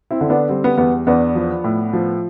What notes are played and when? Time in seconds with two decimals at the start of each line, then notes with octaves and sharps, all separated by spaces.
0.11 C4 E4
0.21 D3
0.30 B3 D4
0.49 G3 C4
0.64 B3
0.78 E2 B3
1.07 E2 B3 D4
1.35 F3
1.64 A2
1.93 F3